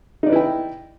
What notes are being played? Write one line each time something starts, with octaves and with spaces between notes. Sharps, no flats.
D#4 E4 B4 D5 G5